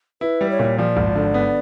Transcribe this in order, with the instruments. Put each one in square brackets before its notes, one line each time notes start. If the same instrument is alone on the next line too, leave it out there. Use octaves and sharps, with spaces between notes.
[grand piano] E4 [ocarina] B4
[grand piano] G3
[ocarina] C#5
[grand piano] A#2
[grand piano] F3 [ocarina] D5
[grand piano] G#1
D3
B3